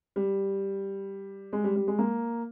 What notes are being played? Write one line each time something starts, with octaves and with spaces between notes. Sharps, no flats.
G3
G#3
G3
G3
G#3
A#3